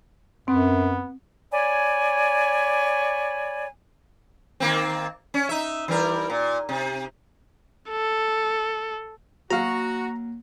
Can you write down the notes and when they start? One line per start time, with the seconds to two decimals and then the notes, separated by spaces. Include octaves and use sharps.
0.48 F#2 B3 C4
1.52 C#5 D5 G#5 B5
4.60 D#3 A#3 C4
5.34 C#4
5.49 D#4 E5
5.88 E3 G3 A#4
6.30 A#2
6.69 C3
7.90 A4
9.51 F#3 A#3 F#4 F5 A#5